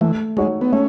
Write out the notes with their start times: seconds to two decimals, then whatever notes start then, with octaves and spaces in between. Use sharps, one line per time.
0.01 E3 A3
0.37 G#3 D#4 F#4 C#5
0.61 B3
0.72 A3 C#4